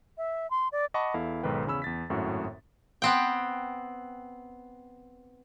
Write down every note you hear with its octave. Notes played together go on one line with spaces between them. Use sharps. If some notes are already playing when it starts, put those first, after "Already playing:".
E5
C6
D5
D#5 F#5 A5 B5 C#6 D6
E2 E4 A4 F5
B1 G#2 D#3 A4 B4 G5
E2 C#3 C#4 B5 E6
E2 A6 B6
G#1 F#2 A2 F#4
B3 C4 G5